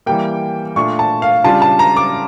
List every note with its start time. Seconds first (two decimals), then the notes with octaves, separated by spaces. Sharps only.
0.06 E3 G3 A#3 G5
0.76 A#2 A3 D4 F4 C#6
0.99 A5
1.22 F5
1.44 C#3 G3 D4 F4 A5
1.62 A5
1.79 A#5
1.97 D6